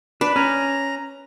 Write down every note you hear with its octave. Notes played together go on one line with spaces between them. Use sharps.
D4 B4
C#4 A#5